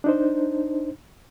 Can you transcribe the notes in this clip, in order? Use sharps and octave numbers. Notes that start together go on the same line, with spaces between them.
D4 D#4 C5